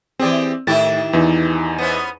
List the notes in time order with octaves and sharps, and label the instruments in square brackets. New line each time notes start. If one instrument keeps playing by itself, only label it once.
[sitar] E3 G4 G#4 [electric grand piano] C4 D5
[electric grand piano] A2 A6 [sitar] D#3 E4 G4
[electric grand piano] E2 E3 D#4
[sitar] B3 C#4 C5